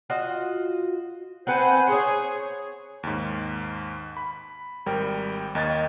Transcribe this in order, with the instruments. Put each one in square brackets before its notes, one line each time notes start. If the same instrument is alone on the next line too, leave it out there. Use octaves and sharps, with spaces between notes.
[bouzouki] F4 F#4 D#5
[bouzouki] C4 B4 [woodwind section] C5 F#5 G#5
[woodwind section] G#4 [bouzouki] C5 C#5
[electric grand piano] D#2 G#2
B5
G#1 G3 A#4 G5
D#2 D#3 D#5 G#6 A6